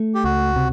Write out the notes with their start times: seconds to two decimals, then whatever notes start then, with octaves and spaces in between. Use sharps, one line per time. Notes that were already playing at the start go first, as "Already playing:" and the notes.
Already playing: A3
0.15 G4
0.24 C#2 F#4
0.56 C3